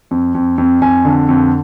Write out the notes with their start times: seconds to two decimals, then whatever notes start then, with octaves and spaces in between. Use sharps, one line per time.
0.11 F2
0.35 F2
0.58 F2
0.82 F2 G#5
1.05 D3
1.29 F2